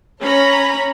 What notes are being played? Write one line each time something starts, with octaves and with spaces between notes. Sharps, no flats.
C#4 C#5 A#5 B5